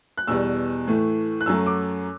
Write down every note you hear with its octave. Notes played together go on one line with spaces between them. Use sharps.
F#6
E2 B2 G3 E6
A2 E3 A3
F#6
F#2 F#3 A3 E6
D6